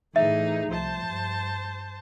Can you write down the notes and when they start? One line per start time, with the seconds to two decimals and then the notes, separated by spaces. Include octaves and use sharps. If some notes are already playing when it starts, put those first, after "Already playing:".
0.16 A2 E3 A3 D#4 G#4 E5
0.71 C2 F3 C5 A5
1.07 G2